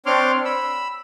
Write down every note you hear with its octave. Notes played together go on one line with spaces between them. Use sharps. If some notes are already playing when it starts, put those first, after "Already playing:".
C4 D4 C#5 C6 D6 F6
B5 E6